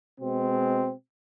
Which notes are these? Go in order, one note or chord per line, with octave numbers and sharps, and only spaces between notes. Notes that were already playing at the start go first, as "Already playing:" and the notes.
B2 G#3 C4